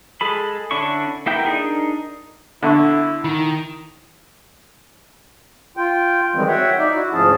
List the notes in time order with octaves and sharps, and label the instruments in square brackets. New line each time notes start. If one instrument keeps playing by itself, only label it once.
[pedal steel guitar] G#3 G#4 A4 B5
D3 C#4 D4 E4 C#6
A#3 B3 E4 A#4 G5
D4 D#4 G#4 A#4
[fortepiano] D3 [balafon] B3 E5 C#6 [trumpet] E4
[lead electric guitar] D#3 [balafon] E4
[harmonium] F4 G5
D#3 E3 G3 G#3 C4
F#4 C#5 E5 F#5 G5
D#4 D5 E5
E4 F#4
D2 G#2 F3 C#4 G#4 A5